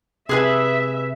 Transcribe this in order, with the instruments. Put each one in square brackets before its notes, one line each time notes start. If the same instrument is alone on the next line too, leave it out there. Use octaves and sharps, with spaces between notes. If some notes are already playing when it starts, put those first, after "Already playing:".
[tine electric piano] C3 [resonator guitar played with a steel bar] G#4 B4 G#5 [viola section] E5